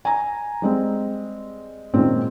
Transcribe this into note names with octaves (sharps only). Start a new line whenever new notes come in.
G#5 A#5
G3 G#3 C4
A#2 D#3 G#3 C4 C#4